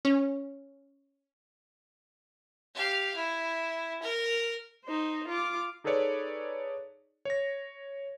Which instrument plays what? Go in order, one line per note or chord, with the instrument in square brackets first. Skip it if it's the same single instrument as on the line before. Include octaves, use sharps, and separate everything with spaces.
[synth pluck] C#4
[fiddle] G4 F5
E4
A#4
[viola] D#4 C5
F4 D6
[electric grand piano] D#4 G#4 A4 B4 C#5 D5
C#5 A#6